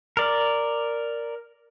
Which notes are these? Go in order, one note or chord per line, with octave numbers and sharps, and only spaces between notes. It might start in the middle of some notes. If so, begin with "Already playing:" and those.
A#4 D5